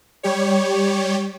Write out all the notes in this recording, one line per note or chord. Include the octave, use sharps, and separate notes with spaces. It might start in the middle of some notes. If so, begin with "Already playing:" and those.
G3 G4 C#5